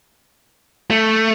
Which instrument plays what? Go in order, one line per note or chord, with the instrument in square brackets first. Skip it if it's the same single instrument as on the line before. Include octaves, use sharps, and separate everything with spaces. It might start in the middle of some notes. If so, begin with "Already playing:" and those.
[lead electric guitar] A3